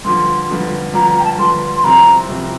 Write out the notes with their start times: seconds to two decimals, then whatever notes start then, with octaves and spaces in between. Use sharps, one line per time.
0.04 G2 D3 F3 C6
0.50 G2 D3 F3
0.94 G2 D3 F3 A#5
1.09 A#5
1.19 G5
1.24 A5
1.38 G2 D3 F3 C6
1.76 C6
1.83 C2 C3 F3 C4 A#5
2.28 C2 C3 F3 C4